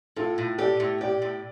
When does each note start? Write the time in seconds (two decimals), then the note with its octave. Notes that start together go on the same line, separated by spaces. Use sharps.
0.16 A2 F4 A4
0.38 A2
0.58 G4 A4 D5
0.80 A2
1.01 G4 D5 G5
1.22 A2